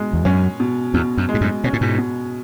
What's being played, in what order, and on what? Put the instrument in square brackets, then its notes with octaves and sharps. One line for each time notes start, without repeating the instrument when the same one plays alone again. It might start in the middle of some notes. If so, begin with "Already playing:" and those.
Already playing: [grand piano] B2 G#3
[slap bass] E2
[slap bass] F#2 [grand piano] C#4
[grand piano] B2
[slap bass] E2 [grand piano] B2
[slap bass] F#2
[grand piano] G#3
[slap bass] G#2
F#2 A2
[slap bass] B2 [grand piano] C#4
[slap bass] A2
G#2 B2
[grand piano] B2